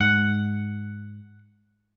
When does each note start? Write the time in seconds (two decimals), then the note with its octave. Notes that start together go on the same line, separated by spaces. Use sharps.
0.01 G#2 F#5